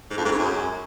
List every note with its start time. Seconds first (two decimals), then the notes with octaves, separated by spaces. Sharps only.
0.10 G#2
0.17 F2
0.24 G#2
0.32 C#3
0.39 F#2